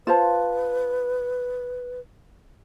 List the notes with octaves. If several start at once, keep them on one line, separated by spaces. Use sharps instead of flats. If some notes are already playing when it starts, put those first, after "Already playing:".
F4 B4 C5 A5